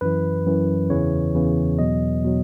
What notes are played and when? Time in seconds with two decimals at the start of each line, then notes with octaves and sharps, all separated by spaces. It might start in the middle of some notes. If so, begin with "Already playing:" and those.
0.01 F#2 E3 B4
0.46 F#2 E3
0.90 E2 C#3 E3 C#5
1.34 E2 C#3 E3
1.79 E2 B2 F#3 D#5
2.24 B2 F#3